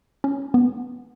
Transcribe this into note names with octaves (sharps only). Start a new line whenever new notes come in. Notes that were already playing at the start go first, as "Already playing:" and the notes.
C#4
B3